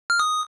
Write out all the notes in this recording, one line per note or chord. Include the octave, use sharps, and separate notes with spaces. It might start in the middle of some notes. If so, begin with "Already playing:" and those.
F6
D#6